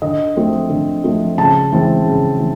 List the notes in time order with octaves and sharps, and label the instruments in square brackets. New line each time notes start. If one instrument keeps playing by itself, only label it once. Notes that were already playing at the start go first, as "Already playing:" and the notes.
[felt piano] D3 D#5
F3 A3 C4
D3
F3 A3 C4
C#3 A5
E3 G#3 C4
C#3
E3